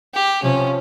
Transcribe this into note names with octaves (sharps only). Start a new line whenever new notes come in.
G4
C3 F3 C4 C#4